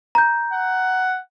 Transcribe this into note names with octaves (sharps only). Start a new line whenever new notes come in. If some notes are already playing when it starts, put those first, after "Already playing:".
A#5 G6
F#5